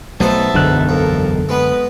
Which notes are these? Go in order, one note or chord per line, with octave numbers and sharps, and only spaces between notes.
B1 F#3 A3 B3 C5 E5 A5
E1 B1 F#2 D3 F#6
F2 A4 A#4
G#3 B3 B4